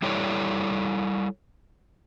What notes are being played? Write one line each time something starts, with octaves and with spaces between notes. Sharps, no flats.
G3 E4 A4 C#5 D5